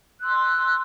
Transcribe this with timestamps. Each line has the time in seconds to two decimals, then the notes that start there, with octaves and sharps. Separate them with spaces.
0.22 C6 E6 F#6